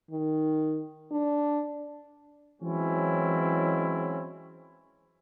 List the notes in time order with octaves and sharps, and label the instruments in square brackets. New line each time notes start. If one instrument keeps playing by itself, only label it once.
[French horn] D#3
D4
[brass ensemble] E3 F#3 G#3 C4 C#4 E4